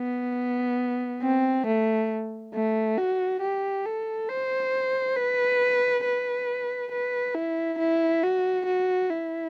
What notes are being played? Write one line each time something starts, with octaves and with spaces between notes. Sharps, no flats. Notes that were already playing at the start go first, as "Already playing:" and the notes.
Already playing: B3
C4
A3
A3
F#4
G4
A4
C5
B4
B4
B4
E4
E4
F#4
F#4
E4